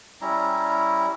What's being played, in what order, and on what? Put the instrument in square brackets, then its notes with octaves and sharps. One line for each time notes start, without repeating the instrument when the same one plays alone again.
[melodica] G3 C#4 E4 A#5